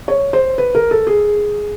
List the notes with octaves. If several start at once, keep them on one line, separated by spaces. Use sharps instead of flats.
C#5
C5
B4
A#4
A4
G#4